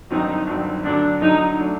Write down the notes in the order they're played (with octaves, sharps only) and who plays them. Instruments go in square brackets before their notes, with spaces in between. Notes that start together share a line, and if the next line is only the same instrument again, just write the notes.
[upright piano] G1 G2 D#3 F#3 C4 [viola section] D#4
[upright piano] G1 G2 D#3 F#3 C4
[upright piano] D2 D3 F#3 [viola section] D4
[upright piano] D2 D3 F#3 [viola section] D#4
[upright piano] F#3 A3 D4